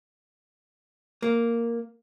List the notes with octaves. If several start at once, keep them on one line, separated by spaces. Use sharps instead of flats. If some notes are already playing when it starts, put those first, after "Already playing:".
A#3